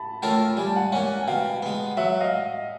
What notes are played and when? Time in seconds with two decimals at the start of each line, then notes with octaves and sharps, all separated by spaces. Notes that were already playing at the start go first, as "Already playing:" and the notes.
Already playing: A5 B5
0.22 A3 C#4 F4 A#4 G5 A5
0.57 G3 G#5
0.67 A5
0.75 F#5 G#5
0.92 A#3 C#4 F#5 G#5
1.23 G#5
1.27 B2 F5 G5
1.63 G#3 B3
1.97 F#3 E5 F#5
2.20 D#5 F5